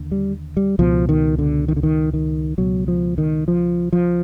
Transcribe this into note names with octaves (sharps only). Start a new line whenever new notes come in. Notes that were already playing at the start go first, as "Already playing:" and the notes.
Already playing: D#2 D3
G3
G3
C#2 B2 F3
D#3
D3
D#3
D3
D#3
D#3
C#2 B2 F#3
F3
D#3
F3
F3